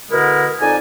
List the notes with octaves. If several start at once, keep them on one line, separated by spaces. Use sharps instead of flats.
B2 D3 G#3 E4 A#4
F2 D#4 D5 G#5